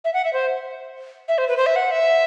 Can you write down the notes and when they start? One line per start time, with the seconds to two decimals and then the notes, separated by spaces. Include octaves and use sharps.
0.05 E5
0.14 F#5
0.24 E5
0.33 C5
1.28 E5
1.38 C5
1.48 B4
1.57 C5
1.66 E5
1.76 F#5
1.91 E5